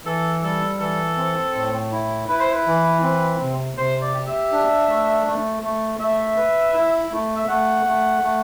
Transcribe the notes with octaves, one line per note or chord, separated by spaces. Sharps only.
E3 A4
G3 A4
E3 A4
C4
A2
E4
E4 B4
C5
B4
E3
C4
C3
C3 C5
D5
G4
E5
D4
A3
A3
A3
A3 E5
B4
E4
A3
E5
A3 F#5
A3
A3